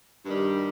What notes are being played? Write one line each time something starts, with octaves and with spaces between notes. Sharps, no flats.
G2 D#3 G3